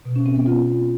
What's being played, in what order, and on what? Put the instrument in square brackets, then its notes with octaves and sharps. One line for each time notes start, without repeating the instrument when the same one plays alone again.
[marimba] B2
C#4
C4
B3
F4